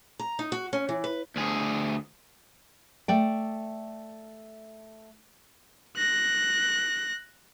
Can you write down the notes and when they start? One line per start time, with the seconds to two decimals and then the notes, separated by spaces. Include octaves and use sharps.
0.19 A#5
0.39 D#4
0.52 F#4
0.73 C#4
0.89 E3
1.04 B4
1.36 D2 G#4
3.08 A3 D5 G5
5.97 F#6 A#6